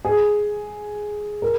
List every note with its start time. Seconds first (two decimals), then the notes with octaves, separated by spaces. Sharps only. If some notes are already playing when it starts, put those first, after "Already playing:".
0.05 G#4
1.42 A#4